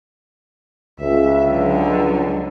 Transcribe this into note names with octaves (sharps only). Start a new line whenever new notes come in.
C#2 E5
D3 F#3